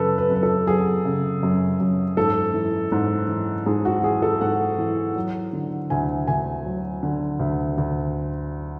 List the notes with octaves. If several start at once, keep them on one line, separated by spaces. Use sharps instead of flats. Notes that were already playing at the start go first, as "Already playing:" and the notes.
Already playing: F#2 C#3 A4 B4
B4
F#2 B4
A4
F#3 G#4
C#3
F#2
F#2
G#2 A4
E3
G#2
E3
G#2 G#4
F#4
E3 G#4
A4
G#2 F#5
E3
F#3
D3
D2 G#5
D2 G#5
F#3
D3
D2
D2